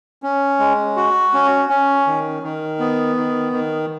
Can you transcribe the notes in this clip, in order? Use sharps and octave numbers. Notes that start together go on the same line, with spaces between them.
C#4
G#3
F#4
C#4
C#4
D#3
D#3
B3
D#3
D#3